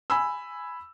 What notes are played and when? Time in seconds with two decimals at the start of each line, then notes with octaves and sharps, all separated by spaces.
0.10 G#5 B5 E6